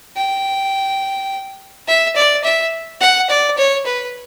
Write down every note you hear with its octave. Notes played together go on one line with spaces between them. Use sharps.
G5
E5
D5
E5
F#5
D5
C#5
B4